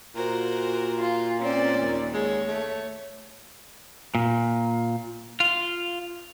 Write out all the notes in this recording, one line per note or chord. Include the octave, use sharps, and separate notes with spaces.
A#2 F#4 A#4 C5
F4
C4 C#4 C5 D5
D#2
G#3 C#5
A3
A#2
F4